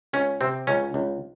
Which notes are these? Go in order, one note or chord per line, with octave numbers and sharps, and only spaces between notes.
C#2 C#4
C3 C4
C#2 C#4
C#2